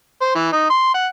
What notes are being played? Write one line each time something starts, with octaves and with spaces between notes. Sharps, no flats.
C5
E3
D#4
C6
F#5